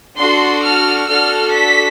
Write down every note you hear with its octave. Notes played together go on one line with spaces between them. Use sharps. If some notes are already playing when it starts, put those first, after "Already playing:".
D4 F#4 A4 C6
F6
D4 F#4 A4 F6
B6